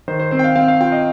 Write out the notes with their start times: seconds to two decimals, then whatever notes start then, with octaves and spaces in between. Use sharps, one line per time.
0.08 D#3 C5
0.20 C5
0.31 C4 C5
0.39 G5
0.44 F5
0.56 C4 F5
0.68 F5
0.81 F4 G5
0.92 D#5